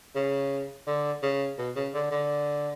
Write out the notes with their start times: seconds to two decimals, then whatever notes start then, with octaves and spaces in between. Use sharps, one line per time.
0.15 C#3
0.87 D3
1.23 C#3
1.58 B2
1.76 C#3
1.94 D3
2.11 D3